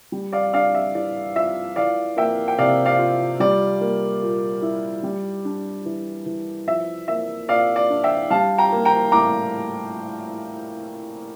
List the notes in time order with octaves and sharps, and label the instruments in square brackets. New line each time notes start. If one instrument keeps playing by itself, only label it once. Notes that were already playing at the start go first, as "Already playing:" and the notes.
[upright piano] G3
D5 F5
D4 D5 F5
E5
E3 D5
F4 E5
E3 D5 F5
A#3 E5 G5
G5
C3 D5 F5
D5 F5
F4
G3 D5
A#3
A#2
E4
G3
D4
E3
E3
F3 E5
A#3 E5
A#2 D5 F5
D5
D4
E5 G5
G3 F5 A5
G5 A#5
A#3
G5 A#5
A2 A#5 D6